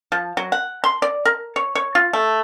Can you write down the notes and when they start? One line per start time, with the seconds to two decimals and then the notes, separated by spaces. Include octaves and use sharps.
0.12 F3
0.37 F#3
0.52 F#5
0.84 C6
1.02 D5
1.25 A#4
1.56 C#5
1.75 C#5
1.95 F4
2.13 A3